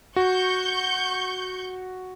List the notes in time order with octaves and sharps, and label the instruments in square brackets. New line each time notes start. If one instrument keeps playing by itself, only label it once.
[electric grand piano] F#4 [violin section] C#6 G6